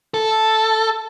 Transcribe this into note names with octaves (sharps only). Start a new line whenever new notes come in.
A4